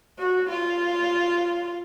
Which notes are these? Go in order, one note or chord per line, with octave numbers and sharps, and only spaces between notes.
F#4
F4